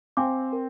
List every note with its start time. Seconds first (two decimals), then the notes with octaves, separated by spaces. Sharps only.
0.17 C4 F5 G#5 D6
0.53 A#4